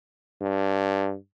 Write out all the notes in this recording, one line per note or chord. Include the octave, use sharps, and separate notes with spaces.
G2